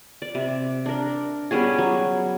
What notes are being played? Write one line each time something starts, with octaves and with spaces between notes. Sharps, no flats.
D5
C3
D4 A#4
G3 B3 C#4 G#4
F#3